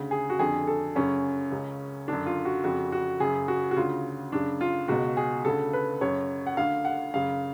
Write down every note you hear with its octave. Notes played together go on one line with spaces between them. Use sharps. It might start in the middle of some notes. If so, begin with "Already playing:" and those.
Already playing: D2 C#3
G#4
F#4
F2 D3 G#4
A4
F#2 C#3 C#4
C#2 C#3
F#2 D3 D4
F4
F#4
F2 C#3 F#4
F#4
F#2 C#3 G#4
F#4
F#4
D2 C#3 F4
F#2 C#3 D4
F4
C#2 B2 F#4
G#4
D2 C#3 A4
B4
F#2 C#3 C#5
F#5
D2 D3 F5
F#5
F#2 C#3 F5